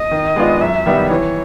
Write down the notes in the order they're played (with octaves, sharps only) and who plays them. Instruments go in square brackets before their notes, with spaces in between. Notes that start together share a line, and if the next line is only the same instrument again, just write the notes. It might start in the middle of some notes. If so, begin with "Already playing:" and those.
Already playing: [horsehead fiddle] D#5
[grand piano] D#3
G#3 B3 D4 F4
[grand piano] F#2 [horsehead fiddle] E5
[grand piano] D#3 G3 B3 D#4
[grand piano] E3 [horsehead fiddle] C#5